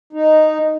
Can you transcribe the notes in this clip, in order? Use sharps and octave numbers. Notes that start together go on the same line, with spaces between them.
D#4